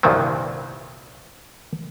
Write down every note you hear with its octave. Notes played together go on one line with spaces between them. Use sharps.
C2 G2 A#2 D#3 F3 F#3